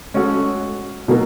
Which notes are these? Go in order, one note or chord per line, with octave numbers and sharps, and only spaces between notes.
G#3 C#4 F#4 A4
B2 F#3 A#3